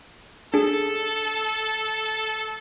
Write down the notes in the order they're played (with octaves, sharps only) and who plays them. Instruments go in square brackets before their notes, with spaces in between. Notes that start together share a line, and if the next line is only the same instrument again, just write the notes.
[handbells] D4 G#4 [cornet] A4